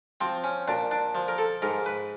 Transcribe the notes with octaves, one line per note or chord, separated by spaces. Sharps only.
F3 C4
C#4
A#2 D4
D4
F3
A#4
A4
G#2 A#4
B4